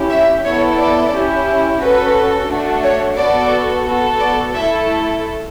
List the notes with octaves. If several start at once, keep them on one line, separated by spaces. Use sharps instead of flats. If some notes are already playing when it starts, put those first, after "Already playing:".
Already playing: C#4 E4 G4
E5
B3 E4 A4 C#5
D5
C#4 E4 G4
C#4 F#4 A4 B4
A3 D4 F#4
C#5
B3 F#4 A4 D5
B3 F#4 A4
D5
A3 E4 A4 E5